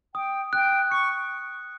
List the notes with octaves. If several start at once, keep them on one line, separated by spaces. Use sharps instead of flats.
G5 D#6
G5 F#6
C#6 C#7